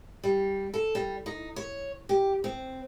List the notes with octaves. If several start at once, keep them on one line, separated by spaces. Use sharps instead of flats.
G3
A4
G3
D#4
C#5
G4
C4